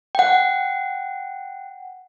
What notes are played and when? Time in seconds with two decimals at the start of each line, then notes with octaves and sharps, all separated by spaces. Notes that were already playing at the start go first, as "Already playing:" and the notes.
0.15 F#5 G5